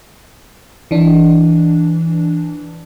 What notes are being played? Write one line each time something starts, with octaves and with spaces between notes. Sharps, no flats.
E3 D4